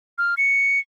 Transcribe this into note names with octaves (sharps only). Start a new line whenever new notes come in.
F6
C#7